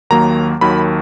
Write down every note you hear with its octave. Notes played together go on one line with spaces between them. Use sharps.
D#2 D#3 F#3 A#3 A#5
D#2 D#3 F#3 A#3 B5